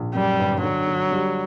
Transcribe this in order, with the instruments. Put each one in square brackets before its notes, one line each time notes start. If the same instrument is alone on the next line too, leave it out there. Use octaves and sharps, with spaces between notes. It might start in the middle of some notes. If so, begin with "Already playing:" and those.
Already playing: [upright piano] A#1
[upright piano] F#2 [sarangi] G3
[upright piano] G1
[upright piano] D3 [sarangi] F#3
[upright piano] D3
G3